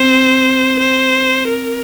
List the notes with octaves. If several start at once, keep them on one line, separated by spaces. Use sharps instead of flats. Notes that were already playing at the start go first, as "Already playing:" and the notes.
Already playing: C4 C5
C5
A#4